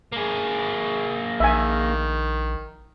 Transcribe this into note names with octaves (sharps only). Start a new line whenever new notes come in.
A#3 G#4
A#1 D#3 E5 G#5